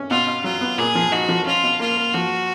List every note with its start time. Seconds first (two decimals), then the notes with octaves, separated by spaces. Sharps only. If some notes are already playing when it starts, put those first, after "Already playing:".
Already playing: C#4
0.10 B2 F4
0.27 B2
0.44 F#3 F4
0.61 B3
0.78 A#2 G#4
0.95 F3
1.12 D#4 F#4
1.29 F3
1.46 C#4 F4
1.63 B2
1.80 A#3 F4
1.97 A#3
2.14 F3 F#4